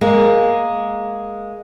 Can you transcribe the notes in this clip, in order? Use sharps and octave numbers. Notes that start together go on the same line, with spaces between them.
G#3 A#3